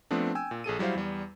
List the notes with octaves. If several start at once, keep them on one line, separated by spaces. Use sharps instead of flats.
F3 A3 B3 C4 D4
G5 G#5 E6
A#2
A#1 G#4 A4 D#7
F#3 G3 E4 C5 F5
E2 G3